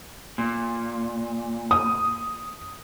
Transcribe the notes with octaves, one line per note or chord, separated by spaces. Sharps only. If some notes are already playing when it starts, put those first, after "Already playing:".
A#2
D#6